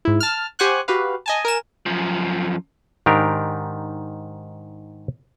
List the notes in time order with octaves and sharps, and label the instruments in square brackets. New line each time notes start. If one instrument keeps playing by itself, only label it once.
[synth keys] G#2 E4
A5 F6
G4 C5 F#5 G#5 C#6 F#6
F#4 G4 B4 F5
D#5 G#5 A5
A#4 G#5 E7
[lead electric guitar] F#2 F3
[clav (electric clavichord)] G#2 D#3 D4 G4 A#4